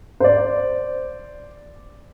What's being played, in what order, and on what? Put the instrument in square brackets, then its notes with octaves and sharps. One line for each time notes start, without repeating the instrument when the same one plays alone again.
[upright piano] C5 D5